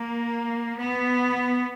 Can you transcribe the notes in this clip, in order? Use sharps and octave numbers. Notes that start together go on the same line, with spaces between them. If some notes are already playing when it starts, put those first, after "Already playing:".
Already playing: A#3
B3